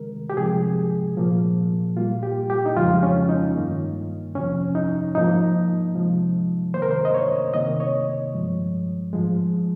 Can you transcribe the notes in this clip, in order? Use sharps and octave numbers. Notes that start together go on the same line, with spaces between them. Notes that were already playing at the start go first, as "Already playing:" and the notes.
Already playing: C3 D#3 G#3 A#4
G4
C3 F3 G#3 G#4
A#2 F3 A#3
A#2 G3 A#3 F4
G4
G4
D#4
F2 C#3 F3 G#3 F4
C#4
D#4
G2 D#3 A#3
F2 C3 F3 C#4
D#4
G#2 F3 A#3 D#4
C3 F3 G#3
C3 D#3 A#3 C5
A#4
C5
D#5
C#5
C3 D#3 A#3 D#5
C#5
G2 F3 G#3
G#2 F3 G#3